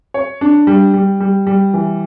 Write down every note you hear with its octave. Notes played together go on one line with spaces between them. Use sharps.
C#5
D4
G3
G3
G3
G3
E3